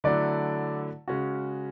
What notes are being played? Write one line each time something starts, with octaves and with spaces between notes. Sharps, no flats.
D3 F#3 A3 E4 D5
C#3 G#3 C#4 F#4